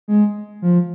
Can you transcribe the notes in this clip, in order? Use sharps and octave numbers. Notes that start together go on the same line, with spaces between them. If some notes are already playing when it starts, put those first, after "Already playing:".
G#3
F3